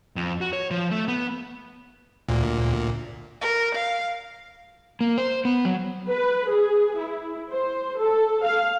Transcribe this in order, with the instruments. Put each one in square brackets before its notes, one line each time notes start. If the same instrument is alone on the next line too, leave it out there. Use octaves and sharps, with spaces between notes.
[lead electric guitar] F2
F#4
C#5
F3
A3
B3
[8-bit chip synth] D2 A#2
[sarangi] A#4
F5
[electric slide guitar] A#3
C5
B3
F#3
[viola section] B4
G#4
E4
C5
A4
F5